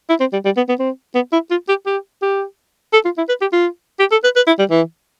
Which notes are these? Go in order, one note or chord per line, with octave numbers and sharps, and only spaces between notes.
E4
C4
G3
G3
B3
B3
C4
B3
E4
F4
G4
G4
G4
A4
F4
E4
B4
G4
F4
G4
A4
B4
B4
E4
G3
E3